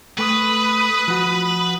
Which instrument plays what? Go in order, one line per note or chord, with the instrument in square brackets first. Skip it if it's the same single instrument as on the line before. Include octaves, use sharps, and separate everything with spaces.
[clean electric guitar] A3 [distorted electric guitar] B4 [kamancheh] B5 D#6
[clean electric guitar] F3 F#4